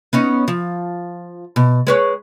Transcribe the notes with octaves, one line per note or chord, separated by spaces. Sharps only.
B3 C#4 D#4
F3
B2
G#3 B4 C#5